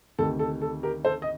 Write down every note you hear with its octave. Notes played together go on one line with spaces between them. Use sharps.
D2 C3 D#3 A4
A4
A4
G4 A#4
A4 C5
D#5